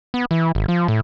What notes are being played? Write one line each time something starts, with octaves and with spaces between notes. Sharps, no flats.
B3
E3
G#1
F3
A2